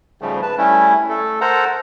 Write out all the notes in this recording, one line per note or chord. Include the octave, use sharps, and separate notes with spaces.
G#2 C#3 F3 G3 A3
B4 A5
G3 A3 C#4 E4
A3 A4
A4 A#4 C5 F#5 A#5